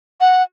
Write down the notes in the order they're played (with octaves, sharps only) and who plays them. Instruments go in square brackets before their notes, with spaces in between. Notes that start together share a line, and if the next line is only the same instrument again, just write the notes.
[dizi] F#5